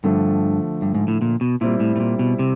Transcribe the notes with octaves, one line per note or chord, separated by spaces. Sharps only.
G2 D3 F3 A3
G2
G#2
A2
A#2
B2
A#2 G3 C4 E4
A2
A2
A#2
B2
C3